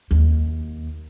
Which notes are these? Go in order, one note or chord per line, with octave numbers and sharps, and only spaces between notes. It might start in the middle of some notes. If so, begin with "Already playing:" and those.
D#2